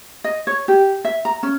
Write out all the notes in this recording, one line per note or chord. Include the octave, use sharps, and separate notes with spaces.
D#5
C#5
G4
E5
A#5
C#4